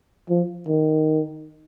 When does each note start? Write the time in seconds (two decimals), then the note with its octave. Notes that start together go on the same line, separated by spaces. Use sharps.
0.30 F3
0.68 D#3